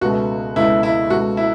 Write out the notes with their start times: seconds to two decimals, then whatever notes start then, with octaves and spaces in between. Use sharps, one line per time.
0.01 C#2 B2 A3 F#4
0.56 C#2 B2 A3 E4
0.83 E4
1.10 C#2 B2 A3 F#4
1.37 E4